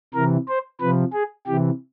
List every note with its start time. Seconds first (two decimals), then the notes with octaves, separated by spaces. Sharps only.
0.14 C3 E3 A#4
0.48 C5
0.80 C3 F3 B4
1.13 G#4
1.46 C3 E3 G4